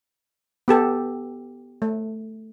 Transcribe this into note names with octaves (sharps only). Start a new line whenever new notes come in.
B3 G4 A4
A3